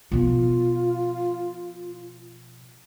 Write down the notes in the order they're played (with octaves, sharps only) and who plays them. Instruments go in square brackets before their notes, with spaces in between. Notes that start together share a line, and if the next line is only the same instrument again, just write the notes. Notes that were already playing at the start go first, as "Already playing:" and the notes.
[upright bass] B2 F3 [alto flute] F4